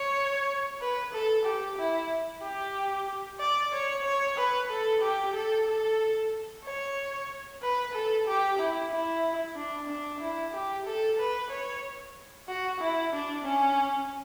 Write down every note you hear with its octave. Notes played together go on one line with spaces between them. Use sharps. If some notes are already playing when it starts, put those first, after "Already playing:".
Already playing: C#5
B4
A4
G4
E4
G4
D5
C#5
C#5
B4
A4
G4
A4
A4
C#5
B4
A4
G4
E4
E4
D4
D4
E4
G4
A4
B4
C#5
F#4
E4
D4
C#4